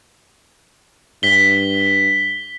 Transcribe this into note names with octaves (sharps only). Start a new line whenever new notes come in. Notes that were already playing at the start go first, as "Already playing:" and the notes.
G2 B6 G7